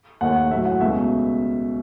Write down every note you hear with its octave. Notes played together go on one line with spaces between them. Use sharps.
D#2 D#3 A3 F#5
A2 F#3 A3 E5
F#5
C#2 B2 A3 E5